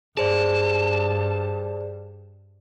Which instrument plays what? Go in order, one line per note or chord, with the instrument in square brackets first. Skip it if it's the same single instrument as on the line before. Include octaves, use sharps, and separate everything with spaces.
[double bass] G2 [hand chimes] G#4 C5 D5 [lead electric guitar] A5